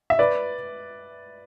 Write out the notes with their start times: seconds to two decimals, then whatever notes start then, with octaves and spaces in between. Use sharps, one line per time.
0.10 E5
0.19 B4 D5